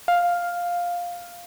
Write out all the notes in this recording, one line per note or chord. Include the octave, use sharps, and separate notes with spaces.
F5